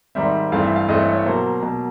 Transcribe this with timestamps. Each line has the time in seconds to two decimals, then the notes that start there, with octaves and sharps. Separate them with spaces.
0.15 G#2 D#3 G3 C4 E5
0.52 G2 E3 A3 C4 F5
0.64 E5
0.76 F5
0.88 G2 E3 A3 C4 D#5
1.02 C#5
1.13 C#5
1.26 B2 F#3 A#3 C5
1.63 B2 F#3 A#3